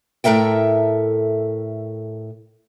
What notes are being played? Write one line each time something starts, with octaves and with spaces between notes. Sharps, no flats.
A2 A4 A#4 E5 G5